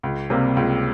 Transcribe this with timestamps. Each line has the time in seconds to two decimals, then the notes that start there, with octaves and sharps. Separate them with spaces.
0.03 C#2
0.30 C3 G3 A#3
0.57 C#2